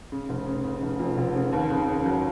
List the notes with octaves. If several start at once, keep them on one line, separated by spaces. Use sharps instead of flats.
C#3
F1
C#3
C#3
F1
F2
F1
C#3
D#2
C#3
C#3
F#3